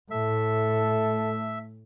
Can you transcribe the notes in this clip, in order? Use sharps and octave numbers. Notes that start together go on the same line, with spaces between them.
A2 A3 A4 E5